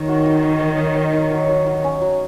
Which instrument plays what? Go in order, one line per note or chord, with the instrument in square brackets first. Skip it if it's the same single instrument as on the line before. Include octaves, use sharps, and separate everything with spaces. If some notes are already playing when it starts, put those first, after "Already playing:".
Already playing: [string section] D#3 [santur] C#5
[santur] F#4
F#4
D#4
C#5
D#4
C#5
D#4
F#3
F#3
F#3
C#4
F#3